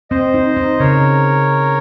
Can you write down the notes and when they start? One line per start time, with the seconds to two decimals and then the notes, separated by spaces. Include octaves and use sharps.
0.11 C4 C5 D#5
0.34 D#4
0.57 D#4
0.79 C#3 A#4 C#5